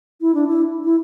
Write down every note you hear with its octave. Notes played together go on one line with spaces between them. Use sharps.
E4
D4
E4
E4